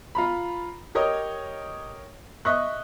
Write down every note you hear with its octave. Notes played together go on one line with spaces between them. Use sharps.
F4 A#5 B5
G4 A#4 C#5 D#5
D#5 E5 C#6 F#6